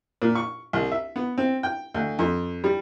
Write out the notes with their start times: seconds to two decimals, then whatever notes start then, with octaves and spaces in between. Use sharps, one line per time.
0.22 A#2
0.35 C#6
0.73 C2
0.92 E5
1.16 B3
1.38 C4
1.63 G5
1.94 D2
2.19 F2
2.64 G3